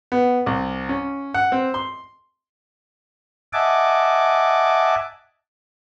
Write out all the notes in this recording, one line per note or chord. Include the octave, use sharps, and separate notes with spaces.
B3
C2
C#4
F#5
C4
C6
D#5 E5 F#5 G#5 A5 D6